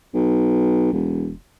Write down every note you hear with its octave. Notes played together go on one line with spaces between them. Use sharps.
B1
E1